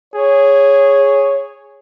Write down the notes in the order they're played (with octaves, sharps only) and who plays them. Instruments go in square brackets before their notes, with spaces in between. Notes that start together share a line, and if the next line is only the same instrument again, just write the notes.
[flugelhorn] G#4 [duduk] C#5